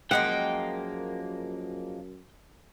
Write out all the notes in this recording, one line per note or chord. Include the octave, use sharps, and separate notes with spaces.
F#2 F3 G#3 A#3 F#5 G5